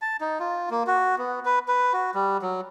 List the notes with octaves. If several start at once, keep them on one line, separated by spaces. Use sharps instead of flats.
A5
D#4
F4
A#3
F#4
B3
B4
B4
F#4
G3
F#3